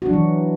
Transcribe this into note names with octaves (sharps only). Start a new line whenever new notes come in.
E3 F#3 D4 F#4